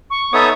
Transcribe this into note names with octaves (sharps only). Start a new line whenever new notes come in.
C#6
B3 D#4 A4 C#5 E5 D#6